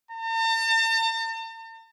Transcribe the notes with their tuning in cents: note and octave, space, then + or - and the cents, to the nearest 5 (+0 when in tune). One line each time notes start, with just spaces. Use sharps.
A5 +45